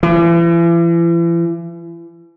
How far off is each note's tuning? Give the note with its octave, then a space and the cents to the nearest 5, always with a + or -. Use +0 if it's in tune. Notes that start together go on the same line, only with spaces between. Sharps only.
E3 +40